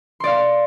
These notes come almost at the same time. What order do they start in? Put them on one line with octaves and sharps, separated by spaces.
C6 D5 F5